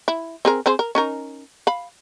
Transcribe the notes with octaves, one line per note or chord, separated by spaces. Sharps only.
E4
C4 G#4 A#4
C4 G#4 C5
A#4
C#4 D#4 A#4
F5 B5